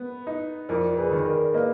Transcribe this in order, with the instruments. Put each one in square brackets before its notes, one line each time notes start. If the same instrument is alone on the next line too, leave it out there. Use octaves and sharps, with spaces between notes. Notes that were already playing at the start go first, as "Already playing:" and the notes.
Already playing: [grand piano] B3 [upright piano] B4
[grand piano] D#4
[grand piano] F2 [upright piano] A#4 D5
[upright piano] A#4
G#4 B4
[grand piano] D#3
[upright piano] A#4 D5
[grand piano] A#3 [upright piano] B4 D#5